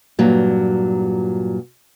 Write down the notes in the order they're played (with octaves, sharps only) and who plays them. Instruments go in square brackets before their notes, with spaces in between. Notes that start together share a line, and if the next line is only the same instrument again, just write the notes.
[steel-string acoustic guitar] G2 A#2 F#3